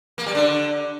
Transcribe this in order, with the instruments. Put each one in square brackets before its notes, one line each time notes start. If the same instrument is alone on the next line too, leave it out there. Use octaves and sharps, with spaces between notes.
[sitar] A#3
G3
D3